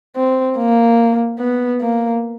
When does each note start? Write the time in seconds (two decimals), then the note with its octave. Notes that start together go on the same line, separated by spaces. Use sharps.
0.16 C4
0.58 A#3
1.39 B3
1.81 A#3